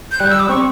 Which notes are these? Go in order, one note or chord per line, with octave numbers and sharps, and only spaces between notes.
G6
G3 F#6
E6
D6
C4 C#6